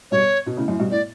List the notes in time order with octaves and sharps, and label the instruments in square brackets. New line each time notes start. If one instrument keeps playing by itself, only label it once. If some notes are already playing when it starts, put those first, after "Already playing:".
[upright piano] G2 B2 [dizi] C#5
[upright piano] B2
A2 C#3
F#2 A2
G2 B2
[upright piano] A2 [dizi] D5